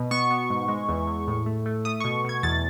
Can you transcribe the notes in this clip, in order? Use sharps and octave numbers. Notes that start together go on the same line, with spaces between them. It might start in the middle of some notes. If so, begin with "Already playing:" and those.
Already playing: B2
B3 C#6
B3
G#2
G#3
E2
E2
A2
A3
A3
A3 D#6
B2 C#6
B2 G#6
E2 A6